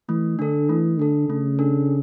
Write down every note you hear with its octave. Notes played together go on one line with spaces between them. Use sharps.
E3 A3
D3 D4 A4
E3 A3
D3 D4 A4
C#3 A3
D4 A4